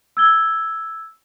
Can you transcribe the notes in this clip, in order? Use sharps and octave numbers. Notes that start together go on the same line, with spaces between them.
E6 G#6 G7